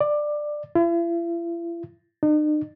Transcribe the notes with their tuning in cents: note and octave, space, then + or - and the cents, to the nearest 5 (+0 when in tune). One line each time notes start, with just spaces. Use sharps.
D5 +15
E4 +45
D#4 -45